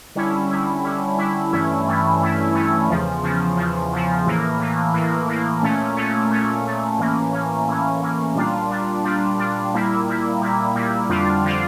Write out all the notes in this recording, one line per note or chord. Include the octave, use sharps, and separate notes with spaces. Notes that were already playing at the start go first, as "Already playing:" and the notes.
D3 G3 C#4 E4
D3 G3 C#4 E4
D3 G3 C#4 E4
D3 G3 C#4 E4
G2 E3 A3 C#4 E4
G2 E3 A3 C#4 E4
G2 E3 A3 C#4 E4
G2 E3 A3 C#4 E4
E2 C#3 F3
E2 C#3 F3
E2 C#3 F3
E2 C#3 F3
A2 E3 A#3
A2 E3 A#3
A2 E3 A#3
A2 E3 A#3
A#2 A3 C#4
A#2 A3 C#4
A#2 A3 C#4
A#2 A3 C#4
A2 E3 A#3 C#4
A2 E3 A#3 C#4
A2 E3 A#3 C#4
A2 E3 A#3 C#4
A#2 G3 D4 F4
A#2 G3 D4 F4
A#2 G3 D4 F4
A#2 G3 D4 F4
A#2 G3 A#3 E4
A#2 G3 A#3 E4
A#2 G3 A#3 E4
A#2 G3 A#3 E4
F2 D3 G3 D4 F4
D3 G3 D4 F4